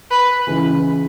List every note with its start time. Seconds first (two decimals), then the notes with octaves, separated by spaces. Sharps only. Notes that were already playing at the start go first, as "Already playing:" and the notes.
0.11 B4
0.47 C#2 C#3 E3